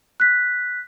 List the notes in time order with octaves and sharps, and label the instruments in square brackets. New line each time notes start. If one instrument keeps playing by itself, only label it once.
[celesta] F#6 B6